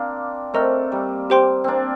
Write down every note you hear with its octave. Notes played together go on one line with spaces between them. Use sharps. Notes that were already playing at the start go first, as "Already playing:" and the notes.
Already playing: A#3 C4 D4 F5
A3 C4 A#4 D#5 A#5 F6
G3 A#3
G4 C5 G5 C6
A#3 C4 D4